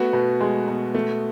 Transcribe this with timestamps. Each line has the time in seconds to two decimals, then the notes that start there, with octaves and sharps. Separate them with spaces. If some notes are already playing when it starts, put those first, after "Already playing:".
Already playing: A3 B3 F#4
0.13 B2
0.41 G#3
0.68 B2
0.94 A3